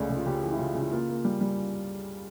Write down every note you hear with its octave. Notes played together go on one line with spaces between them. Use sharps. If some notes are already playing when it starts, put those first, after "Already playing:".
Already playing: C#2 C#3 A3 C#5 D5
C#3
F4
C#3 G4
E3
E4
C#3 F4
C#3
E4
A#3 F4
A#3
G3
G3